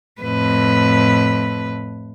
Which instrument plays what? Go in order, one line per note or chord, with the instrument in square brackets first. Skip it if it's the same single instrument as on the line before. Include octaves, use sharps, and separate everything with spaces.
[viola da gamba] F2 A2 B4